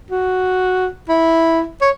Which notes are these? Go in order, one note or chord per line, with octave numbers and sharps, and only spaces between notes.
F#4
E4
C#5